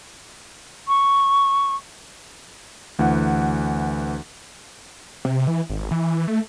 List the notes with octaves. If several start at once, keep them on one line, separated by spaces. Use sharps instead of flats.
C#6
D2 E3 F#5
C3
E3
G#1
E3
A3